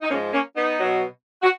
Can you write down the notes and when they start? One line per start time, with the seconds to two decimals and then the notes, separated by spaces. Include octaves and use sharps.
0.01 D#4
0.09 G#2 F3 G#3 A#3 C#4
0.32 A#3 C#4
0.55 B3 D#4
0.78 B2 F#3
1.43 F#4